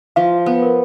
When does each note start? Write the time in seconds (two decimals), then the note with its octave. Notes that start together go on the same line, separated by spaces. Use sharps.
0.16 F3 F5
0.46 B3
0.62 A#4